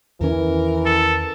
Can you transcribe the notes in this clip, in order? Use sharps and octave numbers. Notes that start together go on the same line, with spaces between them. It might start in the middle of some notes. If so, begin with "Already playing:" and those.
E2 D#3 E3 C#4 A#4
A4